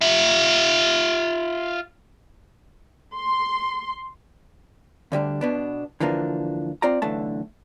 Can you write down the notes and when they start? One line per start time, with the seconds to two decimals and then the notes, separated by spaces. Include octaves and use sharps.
0.01 F4 E5
3.16 C6
5.12 D2 D3 G3 D4
5.41 B2 B3 D4
6.00 D3 E3 F3 A#3 D4
6.82 C4 F4 D5 A#5
7.02 B1 D3 E3 A3 A5